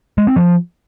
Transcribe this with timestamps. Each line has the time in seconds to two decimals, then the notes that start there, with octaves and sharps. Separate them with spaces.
0.18 G#3
0.27 C4
0.36 F3